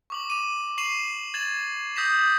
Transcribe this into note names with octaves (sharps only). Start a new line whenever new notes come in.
C#6 D6 F#7
D6 D#7
C#6 C7 D#7 E7 F#7
G#6 A6 E7 F#7
D#6 G6 A#6 B6 E7